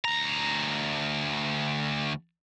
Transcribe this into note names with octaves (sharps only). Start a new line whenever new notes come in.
D2 A#5